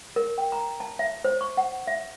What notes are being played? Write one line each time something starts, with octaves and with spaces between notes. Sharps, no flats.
A#4
G5
A#5
A5
E5
C5
C#6
F#5
E5